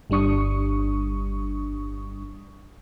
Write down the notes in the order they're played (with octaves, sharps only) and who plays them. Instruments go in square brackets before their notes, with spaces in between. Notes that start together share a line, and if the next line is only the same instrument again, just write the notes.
[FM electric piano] G1 G3 D4 C#6 D#6